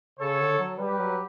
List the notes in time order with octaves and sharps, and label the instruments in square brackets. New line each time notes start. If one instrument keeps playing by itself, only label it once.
[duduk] C#3 [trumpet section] A4 C#5
[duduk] D3
F#3
[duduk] G3 [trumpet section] G4 B4
[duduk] F#3